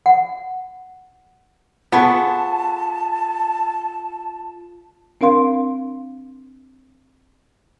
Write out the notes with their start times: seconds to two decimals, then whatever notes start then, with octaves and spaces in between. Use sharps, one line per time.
0.06 F#5
1.92 B3 F4 G#4 A4 A5 C#6
5.21 C4 D4 A#4 F5 C6